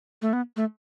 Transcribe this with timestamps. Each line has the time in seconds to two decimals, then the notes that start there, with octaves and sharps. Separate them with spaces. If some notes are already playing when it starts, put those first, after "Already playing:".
0.22 A3
0.33 B3
0.56 A3